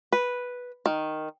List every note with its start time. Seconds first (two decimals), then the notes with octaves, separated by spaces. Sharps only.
0.13 B4
0.86 D#3